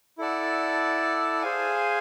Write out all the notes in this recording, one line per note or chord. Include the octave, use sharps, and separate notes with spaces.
E4 A4 D5 F#5 A5
G#4 C5 F5 G#5